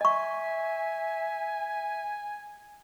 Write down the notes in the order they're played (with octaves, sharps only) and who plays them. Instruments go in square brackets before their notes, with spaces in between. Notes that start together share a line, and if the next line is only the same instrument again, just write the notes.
[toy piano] D#5 C#6 [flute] E5 [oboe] G#5